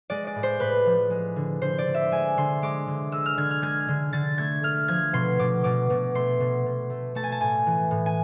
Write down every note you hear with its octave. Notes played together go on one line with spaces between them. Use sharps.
G#3 D5
D5
A2
C5
A2 B4
F3
G#3
D3
D3 C5
D5
D3
E5
G#3 G#5
D3 C6
G#3 D6
D3
G#3 E6
F6
D3 G#6
F6
G#3 G#6
D3
D3 A6
A3 G#6
A3 F6
F3 G#6
B2 C6
B2 D6
B2 D6
B2
A3 C6
B2
B2
A3
A3 A5
G#5
A5
A2 G#5
E3
A2
G#5